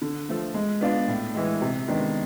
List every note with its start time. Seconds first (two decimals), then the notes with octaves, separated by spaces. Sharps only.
0.02 D3
0.29 F3 A3
0.54 G#3
0.81 B3 D4 F4
1.08 A2
1.35 E3 G#3
1.62 C3
1.88 D#3 G#3 B3 D4